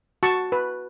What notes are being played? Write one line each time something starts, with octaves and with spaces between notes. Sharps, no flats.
F#4 A5 C#6
B4